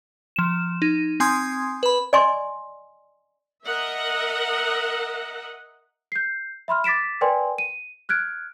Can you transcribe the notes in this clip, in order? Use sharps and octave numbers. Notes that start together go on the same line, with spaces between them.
F3 E7
D#4
C4 G#5 C6 D#6 G#6
B4 B5
D5 D#5 G#5 C6 C#6
A#4 D#5 E5 F#5
G6 C7
E5 B5 C6 F6
D6 A6 B6 D7 E7
A#4 B4 D5 G5 G#5 C6
D#7
F6 F#6 G#6 D7